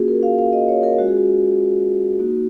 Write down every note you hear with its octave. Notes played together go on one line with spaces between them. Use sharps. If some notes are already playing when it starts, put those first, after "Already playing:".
Already playing: A#3 C#4 F4 F#4 G#4
A#4
F5
F5
D#5
C#5
A#4
G#3 C#4 F4 F#4
G#4
F#4
A#3 D#4 F#4